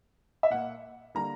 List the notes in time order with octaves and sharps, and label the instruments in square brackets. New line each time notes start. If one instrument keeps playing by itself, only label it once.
[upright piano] E5
A#2 A#3 F#5
D3 G3 A#3 A#5